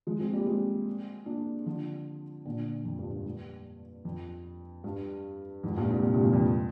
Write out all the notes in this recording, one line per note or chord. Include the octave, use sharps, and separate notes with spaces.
F3 G#3
G#3 C4
G3 A#3
G#3 C4
A#3 D4
D3 F3
A#2 D3
F2
G2
G2
G2
F2
G2
F2 G#2
G2 A#2
G#2 C3
A#2 D3
G#2 C3
G2 A#2
F2 G#2